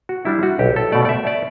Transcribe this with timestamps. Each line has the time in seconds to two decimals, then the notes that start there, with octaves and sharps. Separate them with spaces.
0.09 F#4
0.25 G3 D4 E4
0.43 F#4
0.59 B1 G4
0.76 A4
0.92 B2 A3 D5
1.05 D5
1.09 E5
1.27 D5